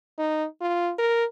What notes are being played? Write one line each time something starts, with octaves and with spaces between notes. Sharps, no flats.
D#4
F4
A#4